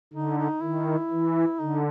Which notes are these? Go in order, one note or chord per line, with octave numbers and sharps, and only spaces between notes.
D3 D#4
D#4
D#3 E4
E3
D3 D#4